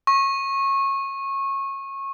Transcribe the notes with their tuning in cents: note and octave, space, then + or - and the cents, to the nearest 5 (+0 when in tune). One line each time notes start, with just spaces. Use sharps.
C#6 -25